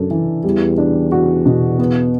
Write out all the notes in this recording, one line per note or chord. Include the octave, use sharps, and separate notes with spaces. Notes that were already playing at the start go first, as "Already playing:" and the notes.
Already playing: F#2 D4 A4
E3
E2 G3
D4
F#4
B2
B3